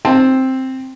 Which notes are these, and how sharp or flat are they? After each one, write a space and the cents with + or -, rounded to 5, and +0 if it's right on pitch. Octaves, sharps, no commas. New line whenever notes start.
C4 +5 A5 +0